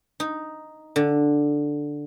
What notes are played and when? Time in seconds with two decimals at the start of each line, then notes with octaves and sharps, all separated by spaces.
0.20 D#4
0.96 D3